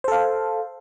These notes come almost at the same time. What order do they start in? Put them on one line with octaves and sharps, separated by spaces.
C5 A4 F5